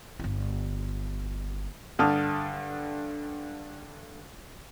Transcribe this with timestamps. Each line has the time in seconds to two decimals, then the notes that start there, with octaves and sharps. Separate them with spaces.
0.19 G1 F4
1.99 G2 D3 A5 D#6 F6